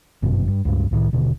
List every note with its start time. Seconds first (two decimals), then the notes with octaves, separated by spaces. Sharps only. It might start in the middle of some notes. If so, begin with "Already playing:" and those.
0.23 G1 F#2 B2
0.48 G2
0.65 C#2 G2
0.91 C2 A2 D#3
1.12 D#1 B2 D3